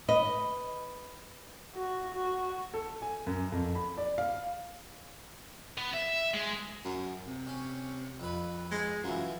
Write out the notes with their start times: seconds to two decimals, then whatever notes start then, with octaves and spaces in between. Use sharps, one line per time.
0.08 B4 D#5
1.75 F#4
2.14 F#4
2.74 A4
3.02 G#5
3.27 F#2
3.52 F2
3.75 B5
3.98 D5
4.18 F5
5.77 B3
5.93 E5
6.34 G#3
6.85 F#2
7.27 C3
7.47 C#4
8.20 F2 B4
8.71 G#3
9.04 F#2 E3 F3